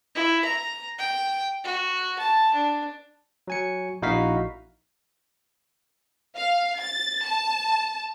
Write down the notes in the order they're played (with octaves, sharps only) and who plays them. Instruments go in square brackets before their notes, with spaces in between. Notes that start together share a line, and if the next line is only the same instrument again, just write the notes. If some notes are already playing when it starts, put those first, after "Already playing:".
[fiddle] E4
A#5
G5
F#4
A5
D4
[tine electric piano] F#3 G#5 C#7
A#1 D#4 E4 F#4 F5 B6
[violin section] F5
A6
A5